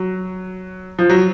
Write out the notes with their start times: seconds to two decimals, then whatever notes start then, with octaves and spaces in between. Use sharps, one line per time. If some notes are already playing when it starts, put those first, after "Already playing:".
Already playing: F#3
0.99 F3
1.10 F#3